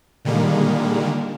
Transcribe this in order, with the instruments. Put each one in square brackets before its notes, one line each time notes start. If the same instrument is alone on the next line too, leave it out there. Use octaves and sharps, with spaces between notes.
[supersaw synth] A#2 D3 D#3 G3 G#3 A#3